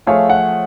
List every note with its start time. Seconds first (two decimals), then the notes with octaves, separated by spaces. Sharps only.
0.07 F3 A3 F4 G#4 C#5 F5
0.30 F#5